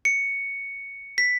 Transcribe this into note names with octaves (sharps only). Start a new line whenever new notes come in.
C#7
B6